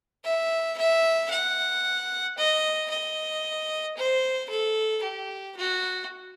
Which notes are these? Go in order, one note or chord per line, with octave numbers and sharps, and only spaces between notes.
E5
E5
F#5
D#5
D#5
C5
A4
G4
F#4